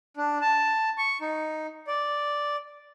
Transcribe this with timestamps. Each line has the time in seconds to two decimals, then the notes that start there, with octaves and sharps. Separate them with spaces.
0.17 D4
0.41 A5
0.98 C#6
1.21 D#4
1.87 D5